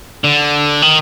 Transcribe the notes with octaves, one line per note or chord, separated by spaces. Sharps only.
D3
D#3